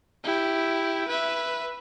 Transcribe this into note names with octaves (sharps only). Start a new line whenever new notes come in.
E4 G4
B4 E5